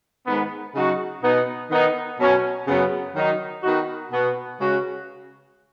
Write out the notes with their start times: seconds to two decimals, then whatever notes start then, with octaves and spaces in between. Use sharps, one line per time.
0.26 G#2 D#3 B3
0.74 C#3 F#3 D#4 F#4
1.22 B2 B3 D#4
1.70 D#3 B3 D#4
2.19 B2 F#3 C#4
2.67 F#2 C#3 F#3 B3
3.15 D#3 F#3 D#4
3.63 D#3 B3 D#4 F#4
4.11 B2 B3 F#4
4.59 C#3 G#3 C#4 F#4